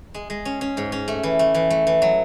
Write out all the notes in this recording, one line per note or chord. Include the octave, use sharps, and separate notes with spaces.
G#3
G#3
C#4
C#4
G#2
C#4
A3
E3
A3
E3
A3
E3
F#3